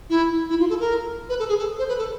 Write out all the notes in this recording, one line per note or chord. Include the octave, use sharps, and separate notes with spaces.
E4
E4
F4
A4
A#4
B4
A4
G#4
A4
C5
B4
A4